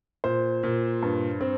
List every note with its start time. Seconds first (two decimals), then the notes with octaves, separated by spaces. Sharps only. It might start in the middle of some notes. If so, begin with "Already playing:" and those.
0.24 A#2 C5
0.63 A#2
1.02 G2
1.41 C4